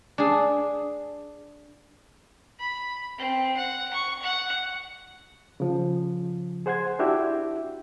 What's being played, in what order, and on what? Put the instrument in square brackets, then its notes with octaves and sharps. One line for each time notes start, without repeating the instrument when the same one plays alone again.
[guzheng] D4 G#4
[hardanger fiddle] B5
C4
F#5
C#6
F#5
[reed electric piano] C#3 F3
G#4 C5 F#5 C6 G#6
D4 E4 F#4 G4 E5